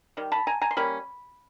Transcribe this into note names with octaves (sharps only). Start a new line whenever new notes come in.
D#3 G3
A5 B5
G#5 A#5
G#5 A#5
C6
G3 A#3 C#4 B5